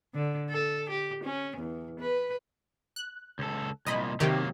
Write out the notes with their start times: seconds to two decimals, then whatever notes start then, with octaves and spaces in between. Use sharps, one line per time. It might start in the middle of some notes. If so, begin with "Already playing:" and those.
0.14 D3
0.50 A4
0.90 G4
1.24 C#4
1.57 E2
2.00 B4
2.96 F#6
3.39 C#2 A4
3.86 C2 A#2 D#5 B5
4.20 C3 D#3 F#3 A#3 G4